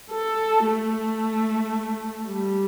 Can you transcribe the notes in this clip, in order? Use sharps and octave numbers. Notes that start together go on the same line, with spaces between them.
A4
A3
G3